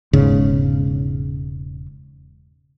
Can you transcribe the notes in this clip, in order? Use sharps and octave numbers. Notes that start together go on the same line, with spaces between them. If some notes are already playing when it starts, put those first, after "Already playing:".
E1 G#2 C#3